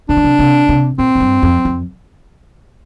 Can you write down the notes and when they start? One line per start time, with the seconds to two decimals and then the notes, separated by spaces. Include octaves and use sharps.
0.09 C3 D4
0.17 D3
0.24 C3
0.39 C3
0.69 C3
0.98 A#2 C4
1.15 A2
1.20 G2
1.43 F2
1.65 F2